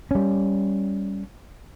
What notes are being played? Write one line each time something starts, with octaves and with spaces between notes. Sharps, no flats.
G3 C#4